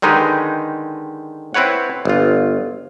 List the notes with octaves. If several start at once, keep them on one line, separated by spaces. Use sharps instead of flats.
D3 D#3 G#3 D#4 G4 B4
C4 E4 B4 C#5 F#5
G1 F4